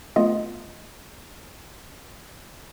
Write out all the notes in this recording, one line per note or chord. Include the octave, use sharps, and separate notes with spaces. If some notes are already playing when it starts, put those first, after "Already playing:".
A3 B3 F4 D#5